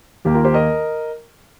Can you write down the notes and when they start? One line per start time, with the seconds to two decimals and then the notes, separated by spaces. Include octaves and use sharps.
0.25 D#2 D#3 A#3 G4
0.34 F4 A#4
0.44 G4 C5
0.54 A#4 D#5